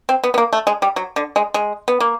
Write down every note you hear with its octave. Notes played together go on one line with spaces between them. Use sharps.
C4
B3
B3
A#3
A3
G#3
G3
F#3
D3
G#3
G#3
B3
A#3